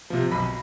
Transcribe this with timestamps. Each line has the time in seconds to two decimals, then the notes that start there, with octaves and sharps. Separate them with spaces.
0.10 C3 F3
0.31 B1 B5